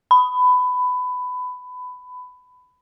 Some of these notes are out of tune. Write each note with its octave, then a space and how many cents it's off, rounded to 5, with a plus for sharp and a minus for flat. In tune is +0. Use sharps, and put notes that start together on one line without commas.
B5 +20